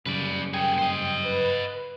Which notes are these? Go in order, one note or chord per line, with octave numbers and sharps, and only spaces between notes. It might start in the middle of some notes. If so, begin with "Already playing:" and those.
F#2 C#3 G3 B4 D5
A#3 G#4 G5
C5 D#5
B4